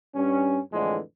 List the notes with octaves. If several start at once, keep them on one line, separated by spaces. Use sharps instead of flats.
G2 C#4
F2 A2 D3 E3 G#3